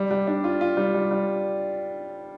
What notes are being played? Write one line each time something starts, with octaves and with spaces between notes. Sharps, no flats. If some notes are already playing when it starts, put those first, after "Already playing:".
Already playing: G3
G3
D4
F4
F4
G3
G3
G3